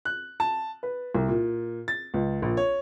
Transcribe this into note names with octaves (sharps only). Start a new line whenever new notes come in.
F#6
A5
B4
C2
A#2
A6
C#2
A#1
C#5